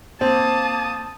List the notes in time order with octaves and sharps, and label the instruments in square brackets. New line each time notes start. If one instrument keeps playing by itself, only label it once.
[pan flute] A#3 [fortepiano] C4 [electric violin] A5 D#6